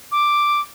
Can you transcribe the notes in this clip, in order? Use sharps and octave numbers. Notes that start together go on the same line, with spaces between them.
D6